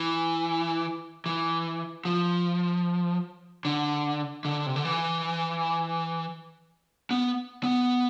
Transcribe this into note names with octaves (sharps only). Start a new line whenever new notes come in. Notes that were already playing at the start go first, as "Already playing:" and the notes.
Already playing: E3
E3
F3
D3
D3
C3
D3
E3
B3
B3